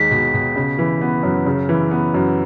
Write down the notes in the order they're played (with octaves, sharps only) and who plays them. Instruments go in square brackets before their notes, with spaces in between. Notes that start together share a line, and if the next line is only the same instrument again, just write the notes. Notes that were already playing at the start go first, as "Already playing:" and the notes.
Already playing: [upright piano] D#2 G#3 D#4 [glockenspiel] B6
[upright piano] B2
B2
C#3
E3
B3
F#2
C#3
E3
B3
F#2